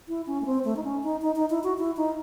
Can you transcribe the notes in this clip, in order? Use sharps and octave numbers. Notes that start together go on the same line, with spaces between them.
E4
C#4
A3
C4
A3
D#4
C#4
D#4
D#4
D#4
E4
F#4
E4
D#4